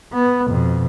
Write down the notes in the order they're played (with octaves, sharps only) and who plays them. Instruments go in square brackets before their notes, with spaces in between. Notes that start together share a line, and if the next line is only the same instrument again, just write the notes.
[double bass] B3
F2 B2